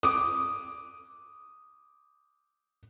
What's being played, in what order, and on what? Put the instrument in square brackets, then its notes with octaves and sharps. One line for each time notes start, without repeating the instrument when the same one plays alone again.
[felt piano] D6 D#6